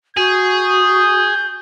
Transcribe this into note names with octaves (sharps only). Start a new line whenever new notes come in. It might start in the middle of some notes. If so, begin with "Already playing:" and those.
F#4 G#4 G6